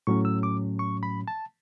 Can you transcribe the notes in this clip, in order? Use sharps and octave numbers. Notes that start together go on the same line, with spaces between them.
A2 F#3 C#4 C#6
E6
D6
C#6
B5
A5